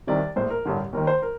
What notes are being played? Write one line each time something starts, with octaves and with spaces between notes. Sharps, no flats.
C2 C3 D#3 D5
A#1 A2 C5
A#4
A1 G2 D3
D#2 D#3 A#4
C5
A#4